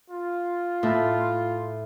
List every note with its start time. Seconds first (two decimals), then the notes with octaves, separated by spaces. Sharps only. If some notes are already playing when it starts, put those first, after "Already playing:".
0.10 F4
0.83 A2